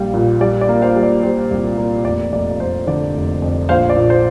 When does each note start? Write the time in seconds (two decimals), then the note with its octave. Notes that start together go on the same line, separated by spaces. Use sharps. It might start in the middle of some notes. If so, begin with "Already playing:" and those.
Already playing: A#1 G3 A#3 F5 G5
0.14 A#2
0.41 G3 D5
0.61 D5
0.69 A#3
0.82 C5 F5
0.95 G3
1.03 D5
1.23 G3 C5
1.51 C2
1.78 A#3
2.05 F1 D5
2.32 F1 D5
2.60 F1 C5
2.87 D3 D5
3.15 F1
3.42 F2
3.69 A#1 C5 F5
3.90 D5
3.97 A#2
4.10 C5